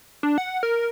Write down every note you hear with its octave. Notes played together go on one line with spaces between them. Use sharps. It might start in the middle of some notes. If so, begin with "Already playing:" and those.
D4
F#5
A#4